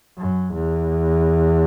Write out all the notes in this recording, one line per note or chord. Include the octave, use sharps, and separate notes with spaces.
F#2
E2